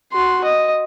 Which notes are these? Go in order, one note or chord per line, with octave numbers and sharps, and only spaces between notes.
F#4 C6
D#5